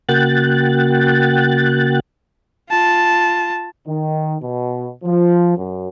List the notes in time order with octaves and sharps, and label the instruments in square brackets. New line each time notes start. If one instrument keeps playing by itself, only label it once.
[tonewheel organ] C#3 A#3 F#4 G5 F#6 A6
[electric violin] F4 A5
[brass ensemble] D#3
B2
F3
F#2